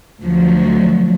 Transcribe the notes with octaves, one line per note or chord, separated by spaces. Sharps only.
D2 F3 F#3